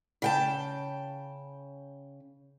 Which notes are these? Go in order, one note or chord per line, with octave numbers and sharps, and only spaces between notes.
C#3 G5 A5